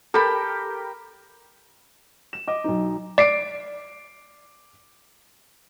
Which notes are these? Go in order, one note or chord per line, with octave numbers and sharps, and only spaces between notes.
G4 A4 A#4 G5 B5
E7
D#5 D6
B1 D#4
D5 D6 C7 D7